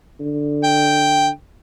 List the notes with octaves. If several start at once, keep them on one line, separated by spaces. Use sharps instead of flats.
D3
G5